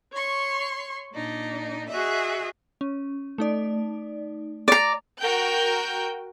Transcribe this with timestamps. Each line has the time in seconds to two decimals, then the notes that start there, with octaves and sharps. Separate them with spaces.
0.12 C#5 C6 C#6
1.13 A#2 D4 D#4
1.89 F#4 G#4 D#5 E5
2.81 C#4
3.38 A3 D#4 D5
4.68 D5 A#5
5.20 F#4 A#4 G5 G6